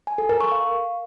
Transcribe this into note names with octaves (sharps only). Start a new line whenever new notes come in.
G#5
A4
A#4
C#6
F5